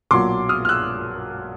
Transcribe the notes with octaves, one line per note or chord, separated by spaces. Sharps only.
B1 A#2 F#3 C6 D6
D#6 F6
F6
E6 F#6